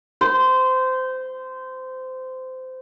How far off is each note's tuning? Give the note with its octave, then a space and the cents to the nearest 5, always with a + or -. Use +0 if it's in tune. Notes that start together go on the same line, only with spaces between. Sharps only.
C5 -20